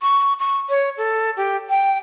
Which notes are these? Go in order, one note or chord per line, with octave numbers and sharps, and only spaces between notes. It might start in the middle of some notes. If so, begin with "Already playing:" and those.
C#6
C#6
C#5
A4
G4
G5